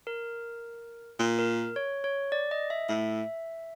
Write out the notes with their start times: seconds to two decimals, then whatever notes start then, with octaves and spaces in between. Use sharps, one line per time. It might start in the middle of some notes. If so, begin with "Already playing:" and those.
0.07 A#4
1.19 A#2
1.39 A#4
1.76 C#5
2.04 C#5
2.32 D5
2.51 D#5
2.70 E5
2.89 A2 E5